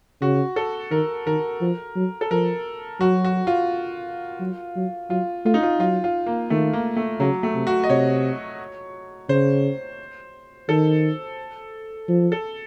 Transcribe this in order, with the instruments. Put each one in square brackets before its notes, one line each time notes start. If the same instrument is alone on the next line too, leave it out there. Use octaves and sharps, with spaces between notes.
[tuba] C#3 [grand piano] F#4
[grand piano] A4
[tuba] D#3 [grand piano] A#4
[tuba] D#3 [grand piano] A#4
[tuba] F3
F#3
[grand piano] A4
[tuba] F3 [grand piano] A#4
[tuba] F#3 [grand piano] F#4
[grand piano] F#4
F4
[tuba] F#3
F#3
[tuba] F#3 [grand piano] F4
[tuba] A3 [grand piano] F4
[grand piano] D#4
F4
[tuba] F#3 [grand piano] F4
[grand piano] F4
A#3
[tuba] D#3 [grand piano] A3
[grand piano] A#3
A3
[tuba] C#3 [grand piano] F#3
[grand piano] A3
[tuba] C3
[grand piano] F#4
D#5
[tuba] C3 [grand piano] C#5
[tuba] C#3 [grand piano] C5
[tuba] D#3 [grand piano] A4
[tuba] F3
[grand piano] A4